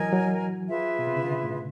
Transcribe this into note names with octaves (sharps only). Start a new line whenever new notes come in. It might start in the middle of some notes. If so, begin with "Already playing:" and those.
Already playing: E3 F#3 A#4 D#5 G#5
F#3
F4 G#4 B4 E5
B2
C3
C#3
D3
A2